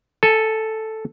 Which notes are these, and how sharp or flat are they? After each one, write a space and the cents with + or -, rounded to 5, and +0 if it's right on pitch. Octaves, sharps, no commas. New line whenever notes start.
A4 +0 G#5 +30